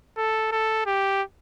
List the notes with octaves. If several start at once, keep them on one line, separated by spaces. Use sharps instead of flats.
A4
A4
G4